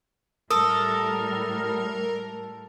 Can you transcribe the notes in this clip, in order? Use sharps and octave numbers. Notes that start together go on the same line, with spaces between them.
A2 G3 A4 A#4 D#6